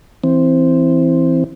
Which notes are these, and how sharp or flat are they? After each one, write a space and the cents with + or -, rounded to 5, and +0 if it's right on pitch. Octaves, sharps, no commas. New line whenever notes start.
E3 +0 C4 +0